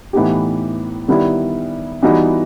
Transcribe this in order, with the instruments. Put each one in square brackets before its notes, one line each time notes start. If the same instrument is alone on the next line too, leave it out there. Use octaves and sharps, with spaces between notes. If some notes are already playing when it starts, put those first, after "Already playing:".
[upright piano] A2 E3 B3 D#4 G4
D#3 G3 B3 E4
E3 G3 B3 D#4 F#4